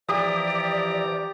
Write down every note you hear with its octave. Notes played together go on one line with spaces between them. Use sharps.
E3 F3 G4 D5 A#5 D#6